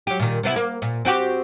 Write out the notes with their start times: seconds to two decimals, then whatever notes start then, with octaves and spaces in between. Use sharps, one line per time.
0.07 F#3 G4
0.20 A#2 D#3
0.43 C3 B3 E4
0.56 A#3
0.82 A#2
1.05 C4 F#4 G4